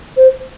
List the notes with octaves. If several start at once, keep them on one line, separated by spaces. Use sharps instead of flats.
C5